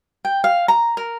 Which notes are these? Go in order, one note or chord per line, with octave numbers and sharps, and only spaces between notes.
G5
F5
A#5
A#4